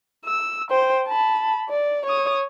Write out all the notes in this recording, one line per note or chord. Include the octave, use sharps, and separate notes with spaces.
E6
C5 G5
A5 B5
D5
C#5 D#6